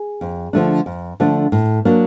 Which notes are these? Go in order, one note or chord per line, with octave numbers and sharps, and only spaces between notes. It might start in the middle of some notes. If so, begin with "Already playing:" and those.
Already playing: G#4
F2
D3 F3 A3 D4
F2
D3 F3 A3 D4
A2
F#3 A#3 D4